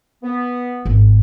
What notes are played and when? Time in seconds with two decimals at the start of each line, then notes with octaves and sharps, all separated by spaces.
0.23 B3
0.85 G#1